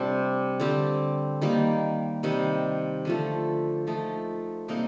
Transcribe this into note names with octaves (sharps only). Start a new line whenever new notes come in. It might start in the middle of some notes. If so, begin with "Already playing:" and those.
Already playing: C3 G3 A3 D4 G4
D3 G3 C4 G4
D#3 G3 A#3
C3 D#3 G3
D3 F3 A3
F3 A3 D#4
C3 G3 A#3 D#4